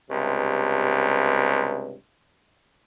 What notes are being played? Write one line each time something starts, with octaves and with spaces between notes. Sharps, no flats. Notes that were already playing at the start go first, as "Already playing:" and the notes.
C#2 G2 C3